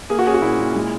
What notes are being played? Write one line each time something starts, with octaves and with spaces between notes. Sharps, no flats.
A#3 G#4
F#4
C#4 G#4
F#4
A#2 E4
A#2
G#3